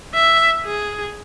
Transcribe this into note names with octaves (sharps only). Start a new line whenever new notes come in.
E5
G#4